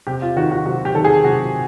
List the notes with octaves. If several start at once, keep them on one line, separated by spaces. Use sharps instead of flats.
C3 G4
F4
D#3 F#4
F#4
C3 F#4
G4
D#3 A4
G#4
C3 F#4